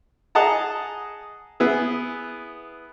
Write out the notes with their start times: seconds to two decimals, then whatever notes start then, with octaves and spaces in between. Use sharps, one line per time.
0.35 G#4 D#5 F#5 A5 A#5
1.60 B3 E4 G#4